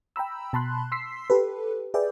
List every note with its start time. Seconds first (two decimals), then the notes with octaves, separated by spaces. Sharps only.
0.16 G5 A#5 B5 E6
0.53 B2 A5 B5 C6 F#6
0.92 C6 E6 B6 C7
1.30 G4 A4 B4
1.94 G#4 B4 D5 E5 G5